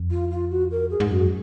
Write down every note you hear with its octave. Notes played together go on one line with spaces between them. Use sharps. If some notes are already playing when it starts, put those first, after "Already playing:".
Already playing: F2
F4
F4
F#4
A#4
G#4
G#2
F#2 F#4